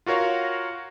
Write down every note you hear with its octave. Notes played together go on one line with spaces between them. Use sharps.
F4 F#4 A#4 C#5 F5